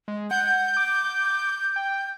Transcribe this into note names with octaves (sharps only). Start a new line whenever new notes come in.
G#3
F#5 G6
D6
G5